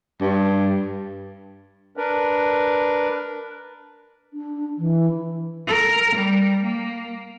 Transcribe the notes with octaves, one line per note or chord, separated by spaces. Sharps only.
G2
D4 A#4 B4
D4
E3
A#4
G3
A#3